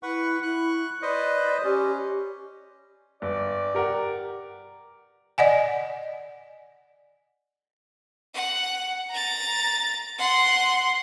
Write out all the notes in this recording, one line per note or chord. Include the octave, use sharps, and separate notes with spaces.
E4 B4 F#5 C#6
E4 C#6 F#6
B4 C5 D5 D#5
C#4 G4
G1 D5
G4 A#4 F#5
D5 D#5 F#5 G#5
F#5
A#5 A6
F#5 C6